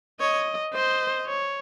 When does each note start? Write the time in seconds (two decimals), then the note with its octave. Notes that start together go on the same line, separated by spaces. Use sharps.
0.20 C#5 D#5
0.73 C5 D#5
1.26 C#5